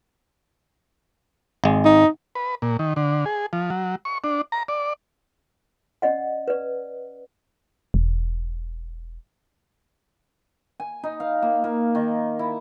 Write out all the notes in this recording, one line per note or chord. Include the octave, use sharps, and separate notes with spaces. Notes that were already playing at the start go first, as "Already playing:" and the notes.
G#1 G#3
D#4
B4
A#2
D#3
D3
G#4
F3
F#3
C#6
D4
A#5
D5
C#4 D5 D#5 F#5
B4 D5
E1
G#5
D#4
F5
A#3
A#3
D#3
E4